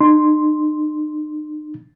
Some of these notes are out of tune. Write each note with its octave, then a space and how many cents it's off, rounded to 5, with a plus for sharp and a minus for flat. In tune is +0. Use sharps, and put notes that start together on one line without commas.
D#4 -40 C6 +0